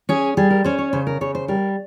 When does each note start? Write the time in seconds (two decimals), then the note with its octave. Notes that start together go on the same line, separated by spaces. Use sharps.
0.09 C#4 G#4
0.37 G3 G#4
0.50 A#4
0.64 C#4 C5
0.78 C#5
0.93 C#3 C5
1.07 A#4
1.21 C#3 C#5
1.35 C5
1.48 G3 A#4